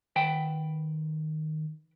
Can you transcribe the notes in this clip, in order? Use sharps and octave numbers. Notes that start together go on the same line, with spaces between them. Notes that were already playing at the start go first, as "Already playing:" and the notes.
D#3 B4 F#5 G5